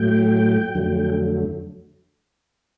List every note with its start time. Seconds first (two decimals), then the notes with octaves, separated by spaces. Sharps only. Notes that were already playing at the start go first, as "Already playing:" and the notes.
Already playing: A2 F#3 A3 G5
0.75 F2 D3 F#3 A3